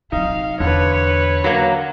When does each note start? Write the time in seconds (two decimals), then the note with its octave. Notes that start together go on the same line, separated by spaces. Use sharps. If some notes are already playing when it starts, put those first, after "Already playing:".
0.12 C3 F#3 D#4 F5
0.60 E2 D3 B4 C#5
1.44 F#3 A#3